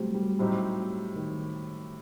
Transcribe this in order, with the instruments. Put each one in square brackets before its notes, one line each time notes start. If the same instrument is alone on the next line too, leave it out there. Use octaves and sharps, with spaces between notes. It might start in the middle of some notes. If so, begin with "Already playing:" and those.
Already playing: [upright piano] F#3 G3 A3 C4
G3
[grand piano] A2 G3 C4 D#4 G4 [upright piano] F#3
[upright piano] D#3